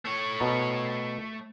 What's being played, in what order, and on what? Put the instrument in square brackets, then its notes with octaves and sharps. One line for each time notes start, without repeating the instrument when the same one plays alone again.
[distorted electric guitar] A3 C#5
[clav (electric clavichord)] B2 A#5